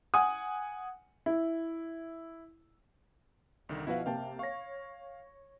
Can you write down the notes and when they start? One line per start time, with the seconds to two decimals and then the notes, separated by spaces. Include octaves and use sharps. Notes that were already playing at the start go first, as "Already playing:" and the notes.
0.14 F#5 G#5 D#6
1.26 E4
3.69 C2 D3 D#3
3.87 B2 F3 E4 F#4 B4 F5
4.06 C3 A#3 F5 G5 A5
4.39 C#5 F5 C#6 A#6